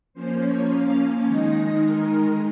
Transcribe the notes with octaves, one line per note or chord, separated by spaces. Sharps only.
F3 A#3 C#4 C5
C#5
F5
D#3 G#3 D#4 D#5
D#5
A#4